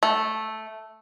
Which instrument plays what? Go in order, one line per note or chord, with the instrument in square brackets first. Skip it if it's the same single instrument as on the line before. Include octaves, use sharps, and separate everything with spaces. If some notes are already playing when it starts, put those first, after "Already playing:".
[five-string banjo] A3